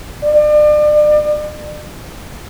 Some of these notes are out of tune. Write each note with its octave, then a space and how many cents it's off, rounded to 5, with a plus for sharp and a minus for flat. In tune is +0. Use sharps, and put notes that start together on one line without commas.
D5 +35